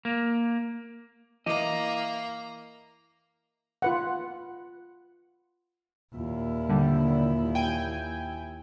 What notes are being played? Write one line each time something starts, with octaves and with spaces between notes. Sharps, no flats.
A#3
E3 A#3 D#5 A#5 D6
F4 B4 F#5
D#2 A#2 E4
D3 G3
G5 G#5